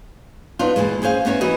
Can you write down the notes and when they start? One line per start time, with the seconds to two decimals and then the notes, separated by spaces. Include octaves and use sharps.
0.59 B3 D4 D#4 F4
0.76 D#2 A#2 E3 G#3
1.02 C#4 G#4 C5 E5 F5
1.25 A#3 B3 C#4 C5 E5
1.41 E3 E4 F#4 A#4 D#5